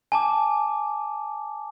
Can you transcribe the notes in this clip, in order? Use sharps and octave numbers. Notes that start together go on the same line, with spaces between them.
G#5 A5 D6